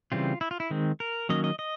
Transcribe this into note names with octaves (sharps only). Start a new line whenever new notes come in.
C#3 E3 G3 C4 F4
E4
F4
E4
D#3 G#3 C4
A#4
D#3 F#3 A#3 C#4 D#5
D#5
D#5